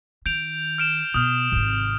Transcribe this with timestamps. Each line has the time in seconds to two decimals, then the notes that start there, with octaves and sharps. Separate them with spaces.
0.26 D#3 G6 D7 F7
0.78 F6 D7 E7
1.14 B2 D#6 F6
1.52 G#1 C3